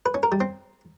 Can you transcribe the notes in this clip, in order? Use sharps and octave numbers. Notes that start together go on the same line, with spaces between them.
B4
C#4
A#4
G3
C4